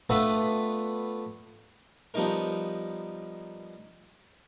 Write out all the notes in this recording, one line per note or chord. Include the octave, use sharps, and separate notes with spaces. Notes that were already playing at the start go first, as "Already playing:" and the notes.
A3 B3 D4 F4 B4 E5
F3 G3 B3 D#4 A#4